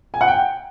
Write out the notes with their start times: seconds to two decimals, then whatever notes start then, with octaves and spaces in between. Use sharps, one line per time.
0.14 G#5
0.21 F#5
0.28 G5